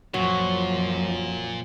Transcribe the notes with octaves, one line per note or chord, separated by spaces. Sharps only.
F#2 A#2 F3 F#3